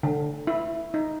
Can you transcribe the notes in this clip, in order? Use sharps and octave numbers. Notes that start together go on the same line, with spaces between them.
D3
E4
D#4